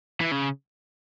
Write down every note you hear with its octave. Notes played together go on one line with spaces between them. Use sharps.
E3
C#3